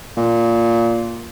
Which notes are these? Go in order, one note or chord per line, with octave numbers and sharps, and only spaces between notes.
A#2